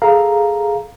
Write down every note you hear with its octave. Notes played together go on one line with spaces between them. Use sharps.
G#4 A4 F5 A#5